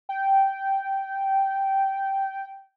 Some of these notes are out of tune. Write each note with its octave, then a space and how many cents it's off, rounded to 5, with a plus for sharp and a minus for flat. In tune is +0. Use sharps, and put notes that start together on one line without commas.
G5 -10